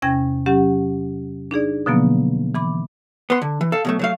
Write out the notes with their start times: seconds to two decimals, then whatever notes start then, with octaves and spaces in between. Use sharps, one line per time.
0.02 E2 C3 C#4 G5 G#6 A#6
0.46 F#3 C#4 G4 F#5
1.51 D4 D#4 G#4 D5
1.86 B2 D3 F3 F#3 A#3 B3
2.55 E3 B5 D6
3.30 B3 C6
3.42 D3
3.61 E3
3.72 A4 F5
3.85 B2 F#3 A3
3.99 F#3 A3 F5